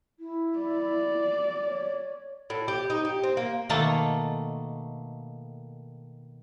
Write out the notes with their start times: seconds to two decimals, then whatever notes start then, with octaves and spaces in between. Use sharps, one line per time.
0.20 E4
0.58 D5
1.65 C#5
2.50 A2
2.68 G4
2.90 D#4
3.05 G4
3.23 C4
3.37 A#3
3.69 B2 D#3 A3 A#3 A4 A5